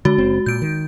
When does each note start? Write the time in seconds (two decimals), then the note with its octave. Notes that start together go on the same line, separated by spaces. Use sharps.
0.05 D3 G#3 F#4
0.18 F#1 C4
0.46 A#2 G6 D7
0.62 D#3